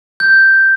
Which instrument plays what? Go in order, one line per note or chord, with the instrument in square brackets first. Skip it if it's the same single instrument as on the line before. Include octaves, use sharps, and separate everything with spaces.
[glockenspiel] G6